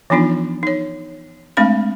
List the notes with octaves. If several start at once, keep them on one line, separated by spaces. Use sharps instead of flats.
E3 F3 B3 D4 D#4 F4
D#4 C#5
G#3 A3 C4 D4 F5 B5